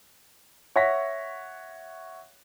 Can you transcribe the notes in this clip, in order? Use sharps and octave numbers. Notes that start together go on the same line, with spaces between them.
C#5 E5 F#5 C#6 A#6 B6